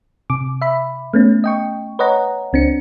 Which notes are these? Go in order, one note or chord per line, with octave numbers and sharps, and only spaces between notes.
C3 D6
E5 B5
A3 B3 C#4
D#5 G5 C#6
B4 C#5 D#5 F#5 A#5
C#2 C4 D4 C#7